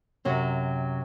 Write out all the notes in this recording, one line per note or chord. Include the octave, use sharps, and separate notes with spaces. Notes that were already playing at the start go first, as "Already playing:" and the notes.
F#2 C3 F#3 F#4